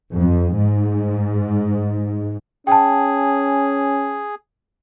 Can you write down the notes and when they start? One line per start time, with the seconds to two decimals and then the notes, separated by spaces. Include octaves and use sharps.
0.14 F2
0.56 G#2
2.67 C#4 G#4 G5 A5